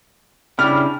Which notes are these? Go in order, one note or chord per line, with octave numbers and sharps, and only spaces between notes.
C#3 G3 D4 E4 F6